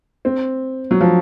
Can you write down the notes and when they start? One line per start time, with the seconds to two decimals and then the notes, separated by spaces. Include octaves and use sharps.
0.25 C4
0.91 F#3
1.01 F3